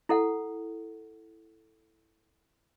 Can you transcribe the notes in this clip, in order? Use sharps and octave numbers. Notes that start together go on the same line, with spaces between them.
E4 A4 F#5